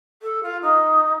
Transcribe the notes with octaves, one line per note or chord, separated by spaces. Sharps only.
A4
F4
D#4